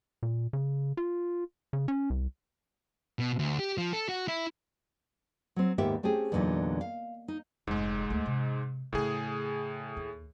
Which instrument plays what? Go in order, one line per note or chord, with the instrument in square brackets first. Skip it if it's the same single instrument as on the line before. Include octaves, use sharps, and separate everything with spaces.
[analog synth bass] A#2
C#3
F4
C#3
C#4
C2
[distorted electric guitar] B2
D2
G4
F3
A4
F#4
E4
[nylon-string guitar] F#3 C4
D#2 G#2 A#3 B3 G4 E5
A3 C4 C#4 G4 G#4
E2 A#2 D3 F#3 D#4
F5
D#4
[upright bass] F1 [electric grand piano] G#2 G#3
[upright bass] D2 A3
C3
[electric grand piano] A2 G#4 [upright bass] C#3 A3
[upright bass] D#2